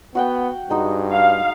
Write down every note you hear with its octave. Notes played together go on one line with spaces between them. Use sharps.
B3 F#4 F#5 G5
G2 G#3 D#4 F#4
F5